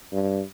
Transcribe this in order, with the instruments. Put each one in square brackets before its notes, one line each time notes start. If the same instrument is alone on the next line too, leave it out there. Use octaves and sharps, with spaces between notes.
[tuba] G2